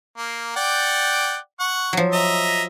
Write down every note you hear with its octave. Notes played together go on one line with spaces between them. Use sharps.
A#3
D5 F#5 G5
F#5 C#6
F3 F#3
D#5 E5 A#5